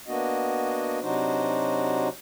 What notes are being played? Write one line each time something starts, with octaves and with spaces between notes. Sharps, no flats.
A#3 B3 D4 F#4 D#5
C3 F#3 D4 D#4 F#4 C5